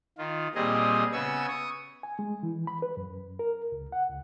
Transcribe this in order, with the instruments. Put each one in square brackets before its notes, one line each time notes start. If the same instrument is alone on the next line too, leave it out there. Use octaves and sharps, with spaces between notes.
[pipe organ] D#3 F4
A#2 G3 C4 G#4 D#5
C#3 B3 G#5 C#6 E6 G#6
C#6 D#6
[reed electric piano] G#5
G#3
E3
B5
B4
F#2
A#4
C#2
F#5
C#2